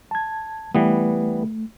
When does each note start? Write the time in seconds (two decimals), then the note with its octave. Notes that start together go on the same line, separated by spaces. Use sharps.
0.11 A5 G#6
0.75 E3 G3 A3 B3